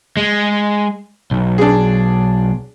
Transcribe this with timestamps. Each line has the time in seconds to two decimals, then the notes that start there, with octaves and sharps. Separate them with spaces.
0.17 G#3
1.31 B1
1.58 D4 G#4